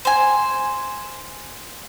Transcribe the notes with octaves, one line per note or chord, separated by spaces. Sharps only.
C5 G#5